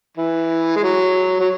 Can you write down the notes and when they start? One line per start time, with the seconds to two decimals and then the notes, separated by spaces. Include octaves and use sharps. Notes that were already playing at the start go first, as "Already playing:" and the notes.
0.17 E3
0.76 G#3
0.83 F#3
1.40 F#3